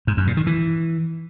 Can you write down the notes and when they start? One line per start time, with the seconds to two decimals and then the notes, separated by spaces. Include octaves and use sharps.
0.07 G#2
0.17 F#2
0.27 A#2
0.37 D#3
0.47 E3